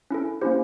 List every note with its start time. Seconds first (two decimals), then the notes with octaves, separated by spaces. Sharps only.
0.11 C#4 E4 A4
0.41 A#3 C#4 E4 G4 C5